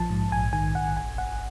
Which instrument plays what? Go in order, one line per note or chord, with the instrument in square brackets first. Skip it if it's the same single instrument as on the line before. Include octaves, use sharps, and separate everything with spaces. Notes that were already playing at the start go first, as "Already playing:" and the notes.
Already playing: [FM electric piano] A#1 F3 A5
G#2
A#1 G#5
D#3 G#5
A#1 F#5
G1 G#5
G1 F#5